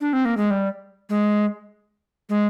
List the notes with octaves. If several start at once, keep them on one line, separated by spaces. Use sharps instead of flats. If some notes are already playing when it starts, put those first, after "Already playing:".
D4
C4
A#3
G#3
G3
G#3
G#3